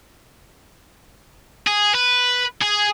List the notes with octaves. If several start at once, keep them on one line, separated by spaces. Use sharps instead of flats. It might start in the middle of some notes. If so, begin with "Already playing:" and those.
G#4
B4
G#4